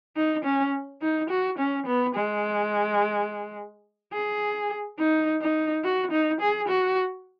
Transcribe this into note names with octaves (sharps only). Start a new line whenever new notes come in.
D#4
C#4
D#4
F#4
C#4
B3
G#3
G#4
D#4
D#4
F#4
D#4
G#4
F#4